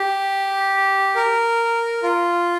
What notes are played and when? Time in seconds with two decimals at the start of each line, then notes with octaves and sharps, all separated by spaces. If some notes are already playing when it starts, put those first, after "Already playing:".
Already playing: G4
1.15 A#4
2.03 F4